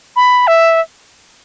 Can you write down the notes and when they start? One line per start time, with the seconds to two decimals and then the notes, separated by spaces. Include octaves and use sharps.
0.16 B5
0.47 E5